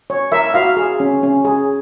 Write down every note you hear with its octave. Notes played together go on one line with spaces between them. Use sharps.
C#5
A#4 E5
F#4 F5
G#4
C#4
C#4
G#4